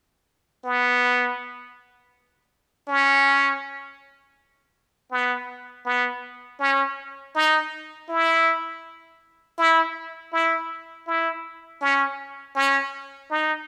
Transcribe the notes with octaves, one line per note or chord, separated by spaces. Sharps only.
B3
C#4
B3
B3
C#4
D#4
E4
E4
E4
E4
C#4
C#4
D#4